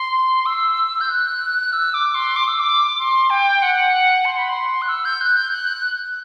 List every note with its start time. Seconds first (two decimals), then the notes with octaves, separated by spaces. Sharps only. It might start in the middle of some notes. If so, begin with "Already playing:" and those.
Already playing: C6
0.46 E6
1.01 G6
1.09 F#6
1.73 E6
1.94 D6
2.15 C6
2.36 D6
2.48 E6
2.59 D6
2.99 C6
3.30 G5
3.62 F#5
4.25 C6
4.38 B5
4.49 C6
4.82 F#6
4.89 E6
5.05 G6
5.21 F#6
5.37 G6
5.51 F#6